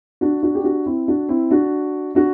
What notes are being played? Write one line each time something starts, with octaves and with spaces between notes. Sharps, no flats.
D4 F#4
D4 F#4
G4
D4 F#4
C4 E4
D4 F#4
C4 E4
D4 F#4
D4 F#4